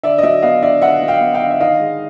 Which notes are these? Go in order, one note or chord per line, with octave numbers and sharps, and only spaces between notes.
D3 D5 E5
D#5
F#3 D5 E5
B3 D#5 F5
D3 D5 E5
D3 E5 F#5
F#3
F5 G5
B3
F5 G5
D3
E5
D#3 D#5 F5
G#3